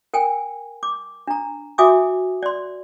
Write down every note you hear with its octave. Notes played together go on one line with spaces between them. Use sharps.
A#4 G5 G#5
D6
D4 A#5
F#4 E5 G#5 D6 D#6
D5 C6